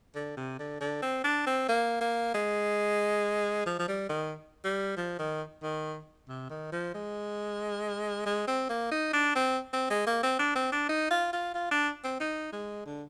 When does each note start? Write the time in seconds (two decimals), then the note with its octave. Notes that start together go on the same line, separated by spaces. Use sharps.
0.15 D3
0.37 C3
0.59 D3
0.81 D3
1.02 C4
1.24 D4
1.47 C4
1.68 A#3
2.01 A#3
2.34 G#3
3.66 F3
3.79 F3
3.88 G3
4.09 D#3
4.64 G3
4.97 F3
5.19 D#3
5.63 D#3
6.29 C3
6.50 D#3
6.72 F3
6.94 G#3
8.26 G#3
8.47 C4
8.69 A#3
8.91 D#4
9.13 D4
9.35 C4
9.73 C4
9.90 G#3
10.06 A#3
10.23 C4
10.39 D4
10.55 C4
10.72 D4
10.89 D#4
11.11 F4
11.33 F4
11.54 F4
11.71 D4
12.04 C4
12.20 D#4
12.53 G#3
12.86 D3